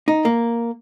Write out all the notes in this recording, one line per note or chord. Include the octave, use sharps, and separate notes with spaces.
D#4
A#3